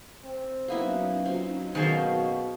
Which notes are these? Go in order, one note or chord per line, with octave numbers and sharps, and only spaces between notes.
C4
F#3 A#3 B3 C#4 D#4 E4
C4 F4
B2 D#3 A#3 G#4 C5 F5 G5